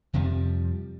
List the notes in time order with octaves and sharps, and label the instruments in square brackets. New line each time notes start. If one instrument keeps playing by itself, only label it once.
[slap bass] F2 C3 F3 G3